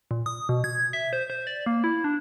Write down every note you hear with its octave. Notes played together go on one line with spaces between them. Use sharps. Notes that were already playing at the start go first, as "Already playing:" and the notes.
A#2
D#6
B2
G#6
E5
C5
C5
D5
A#3
E4
D4